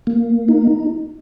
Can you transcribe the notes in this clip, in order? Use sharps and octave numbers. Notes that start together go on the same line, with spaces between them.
A#3
D#4